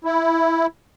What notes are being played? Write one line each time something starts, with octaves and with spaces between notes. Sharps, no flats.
E4